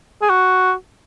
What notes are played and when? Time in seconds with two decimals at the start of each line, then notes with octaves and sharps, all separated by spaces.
0.22 G#4
0.30 F#4